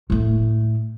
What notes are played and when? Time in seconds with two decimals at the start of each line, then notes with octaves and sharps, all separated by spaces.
0.10 A2 A3